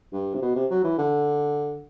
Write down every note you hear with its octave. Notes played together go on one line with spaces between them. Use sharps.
G2
C3
B2
C3
F#3
E3
D3